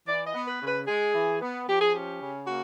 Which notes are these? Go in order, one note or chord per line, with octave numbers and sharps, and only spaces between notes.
E3 D5
D#5
B3
B4
C#3
B4
G#3 G#4
E3
B3
F3 G4
G#4
C#4 G4
C#3
A#3 F#4